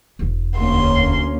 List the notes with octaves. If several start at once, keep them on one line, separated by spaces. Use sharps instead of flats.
E1 E4
D2 A#3 C#4 C6